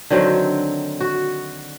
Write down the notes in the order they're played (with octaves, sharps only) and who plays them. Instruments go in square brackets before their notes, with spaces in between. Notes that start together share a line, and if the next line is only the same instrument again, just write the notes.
[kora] D3 D#3 F#3 C4
F#4